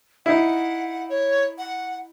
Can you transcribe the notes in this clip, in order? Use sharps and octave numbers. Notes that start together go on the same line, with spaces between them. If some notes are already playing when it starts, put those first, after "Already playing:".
D#4 E4 F#5
C#5
F#5